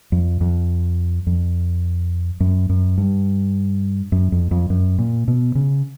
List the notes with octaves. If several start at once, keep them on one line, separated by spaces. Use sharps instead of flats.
F2
F2
F2
F#2
F#2
G2
F#2
F2
F2
F#2
A#2
B2
C#3